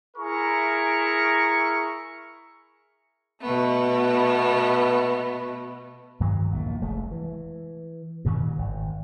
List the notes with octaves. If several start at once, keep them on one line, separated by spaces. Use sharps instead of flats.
E4 G#4 A#4 A#5 C#6
B2 A3 B3
G2 D#3 F#3 G#3
A#1 E2 A#2
F1 G#3 A3
E3
G2 A#2 D#3 E3
G#1